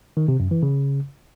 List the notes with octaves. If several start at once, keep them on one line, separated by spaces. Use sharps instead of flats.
D#3
C3
F#2
E3
C#3